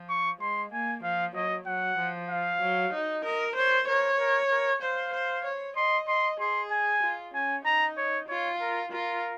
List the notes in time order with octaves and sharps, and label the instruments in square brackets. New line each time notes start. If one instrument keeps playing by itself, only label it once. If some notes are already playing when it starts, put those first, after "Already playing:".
Already playing: [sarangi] F3
[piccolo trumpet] C#6
[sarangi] G#3 [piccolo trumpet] C6
[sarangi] A#3 [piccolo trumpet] G#5
[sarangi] F3 [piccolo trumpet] F5
[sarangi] F#3 [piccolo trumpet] D#5
[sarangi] F#3 [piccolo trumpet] F#5
[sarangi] F3
[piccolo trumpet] F5
[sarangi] F#3
D#4
[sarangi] A#4 [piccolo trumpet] D#5
[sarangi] C5 [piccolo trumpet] C#5
[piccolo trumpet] A#4 [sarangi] C#5
[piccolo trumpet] A#4
A#4
[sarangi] C5 [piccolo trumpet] F5
[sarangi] C5
C#5
[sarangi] D#5 [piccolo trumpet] C6
[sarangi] D#5 [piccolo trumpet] C6
[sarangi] G#4 [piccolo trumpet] C6
[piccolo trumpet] G#5
[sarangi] F4
[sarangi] C#4 [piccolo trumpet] G#5
[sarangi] D#4 [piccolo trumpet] A#5
[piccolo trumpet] C#5
[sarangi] F4 [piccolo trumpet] C#5
[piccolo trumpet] A#4
[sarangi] F4 [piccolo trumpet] A#4